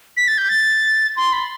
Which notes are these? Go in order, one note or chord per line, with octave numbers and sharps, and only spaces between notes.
B6
A6
G6
A6
C6
B5